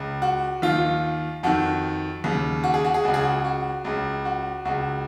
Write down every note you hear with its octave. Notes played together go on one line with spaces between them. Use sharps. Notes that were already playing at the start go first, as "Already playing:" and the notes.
Already playing: C#2 C#3
F#4
D#2 D#3 F4
F2 D#3 F#4
D#2 C#3
F#4
G#4
F#4
G#4
C#2 C#3 F#4
G#4
F#4
F#4
C#2 C#3
F#4
C#2 C#3 F#4